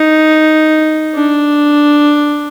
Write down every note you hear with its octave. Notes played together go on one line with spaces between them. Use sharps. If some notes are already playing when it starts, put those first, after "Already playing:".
Already playing: D#4
D4